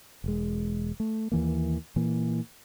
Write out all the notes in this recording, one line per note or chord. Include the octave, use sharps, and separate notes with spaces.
E1 G#3
A3
D#2 E3 A#3
A#2 E3 A#3